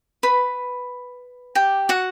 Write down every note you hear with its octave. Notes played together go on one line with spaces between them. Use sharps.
B4 B5
G4 G5
F#4 F#5